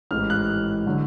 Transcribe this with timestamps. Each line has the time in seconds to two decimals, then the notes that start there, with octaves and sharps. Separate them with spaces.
0.11 A1 G#2 E3 A3 F6
0.30 F#6
0.87 D3 F#3